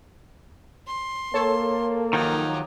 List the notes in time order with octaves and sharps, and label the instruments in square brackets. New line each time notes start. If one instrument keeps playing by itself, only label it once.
[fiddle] C6
[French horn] A#3 [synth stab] A4 C#5 A5
[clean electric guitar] D#3 F3 F#3 [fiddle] D#4 G4